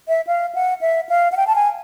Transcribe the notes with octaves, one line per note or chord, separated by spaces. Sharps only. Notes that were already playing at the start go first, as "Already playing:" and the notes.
E5
F5
F#5
E5
F5
F#5
G5
A5
G#5